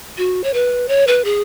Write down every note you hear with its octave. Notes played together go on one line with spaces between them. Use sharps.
F#4
C#5
B4
C#5
B4
G#4